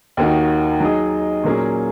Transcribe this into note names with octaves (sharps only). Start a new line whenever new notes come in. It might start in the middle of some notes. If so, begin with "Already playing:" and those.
D#2 D#3 A#3 D#4 F#4
F#3 D#4 G#4 D#5
A#2 F#3 A#3 C#4 G#4